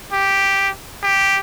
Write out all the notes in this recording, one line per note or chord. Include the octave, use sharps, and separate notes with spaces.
G4
G4